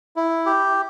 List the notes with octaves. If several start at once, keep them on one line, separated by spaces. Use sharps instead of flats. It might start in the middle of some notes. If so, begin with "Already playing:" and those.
E4
G4